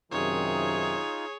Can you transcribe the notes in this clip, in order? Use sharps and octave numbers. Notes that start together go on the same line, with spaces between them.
F#2 C3 D#3 D#4 F4 G#4 C#5